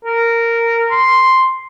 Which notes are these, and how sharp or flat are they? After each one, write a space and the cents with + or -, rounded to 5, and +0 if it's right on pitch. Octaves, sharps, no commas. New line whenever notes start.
A#4 -10
C6 +0